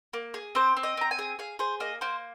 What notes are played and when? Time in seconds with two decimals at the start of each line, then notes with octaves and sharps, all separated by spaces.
0.13 A#3
0.34 G#4
0.55 C4 C5
0.77 C4
0.83 D#5
0.97 C4 A#5
1.11 G#5
1.19 G#4
1.39 G#4 F5
1.59 G#4 C5
1.80 A#3 D#5
2.01 A#3 C5